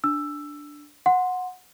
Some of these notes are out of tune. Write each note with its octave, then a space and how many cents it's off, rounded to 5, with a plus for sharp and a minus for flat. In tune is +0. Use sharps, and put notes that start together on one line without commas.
D4 +0 E6 +10
F#5 -15 C6 +0